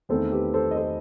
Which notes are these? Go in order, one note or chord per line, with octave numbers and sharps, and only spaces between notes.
E2 D#3 A3 C4 A4 C5
G4 B4
A4 C5
D#5
A4 C5